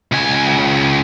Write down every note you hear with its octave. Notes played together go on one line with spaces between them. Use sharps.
C#2 G#5